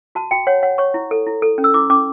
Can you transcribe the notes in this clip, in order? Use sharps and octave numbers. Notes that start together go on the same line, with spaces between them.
F#4 A5
F#4 G5
C#5 F#5
C#5 F#5
C#5 C#6
E4
A4
E4
A4
C#4
E6
E4 D6
C#4 D6